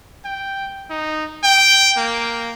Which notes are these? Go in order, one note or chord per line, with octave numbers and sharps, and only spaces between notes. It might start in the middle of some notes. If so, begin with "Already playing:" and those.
G5
D#4
G5
A#3